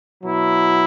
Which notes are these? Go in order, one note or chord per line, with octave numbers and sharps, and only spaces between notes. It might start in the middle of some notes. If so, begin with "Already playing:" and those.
B2 F#3 E4